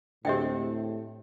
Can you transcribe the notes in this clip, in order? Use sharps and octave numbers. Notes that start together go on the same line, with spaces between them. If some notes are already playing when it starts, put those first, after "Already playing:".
D2 A2 G#3 C4 G4 E5 G5